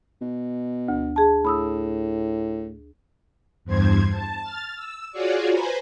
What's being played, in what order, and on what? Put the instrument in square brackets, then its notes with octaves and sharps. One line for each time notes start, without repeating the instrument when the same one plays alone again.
[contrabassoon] B2
[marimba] D2
G#4 A5
[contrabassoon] A2 [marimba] B5 D#6 E6
[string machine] E2 G2 C5 G#6
A5
F6 A6
E6
F4 F#4 G#4 C#5 D5
B4 C5 G#5 A#5 B5